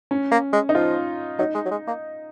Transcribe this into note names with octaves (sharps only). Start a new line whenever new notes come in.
C#4
A#3
G#3
D#4
F3 F4
F#3 D#4
G#3
F#3
G#3
A#3